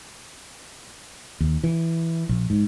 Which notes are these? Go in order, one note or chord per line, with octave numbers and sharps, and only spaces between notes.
D#2
E3
A#1
G#2